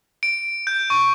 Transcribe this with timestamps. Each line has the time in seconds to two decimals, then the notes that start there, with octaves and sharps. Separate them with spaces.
0.23 D7
0.67 G6
0.90 C#6